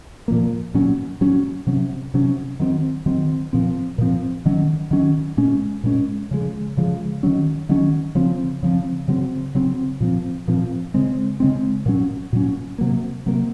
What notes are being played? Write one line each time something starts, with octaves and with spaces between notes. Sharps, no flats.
A#2 F3 A#3
A#2 F#3 C#4
A#2 F#3 C#4
C3 F#3 C#4
C3 F#3 C#4
D#3 F#3 C4
D#3 F#3 C4
A#2 F3 C4
A#2 F3 C4
D#3 F#3 C#4
D#3 F#3 C#4
A#2 G#3 C#4
A#2 G#3 C#4
C#3 F3 G#3
C#3 F3 G#3
D#3 F#3 C#4
D#3 F#3 C#4
C#3 F3 C4
C#3 F3 C4
C#3 F#3 C4
C#3 F#3 C4
A#2 F3 C4
A#2 F3 C4
C#3 G#3 C4
C#3 G#3 C4
A#2 F#3 C#4
A#2 F#3 C#4
C3 F#3 A#3
C3 F#3 A#3